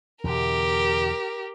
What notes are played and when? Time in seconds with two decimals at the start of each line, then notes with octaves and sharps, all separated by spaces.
0.24 E2 B2 D3 G4 A#4